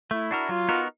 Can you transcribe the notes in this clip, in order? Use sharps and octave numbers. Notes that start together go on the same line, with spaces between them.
A3 E4
D4 F#4 A#4
F#3 F4
B3 D#4 F#4 A#4